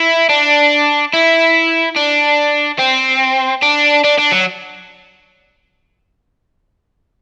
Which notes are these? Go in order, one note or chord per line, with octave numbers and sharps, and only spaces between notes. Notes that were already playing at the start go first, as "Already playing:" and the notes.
Already playing: E4
D4
E4
D4
C4
D4
D4
D4
F#3